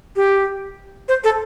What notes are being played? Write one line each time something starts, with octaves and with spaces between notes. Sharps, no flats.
G4
C5
A4